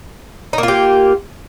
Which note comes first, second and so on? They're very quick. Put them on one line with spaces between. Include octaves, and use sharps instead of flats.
D#4 A#3 F4 G4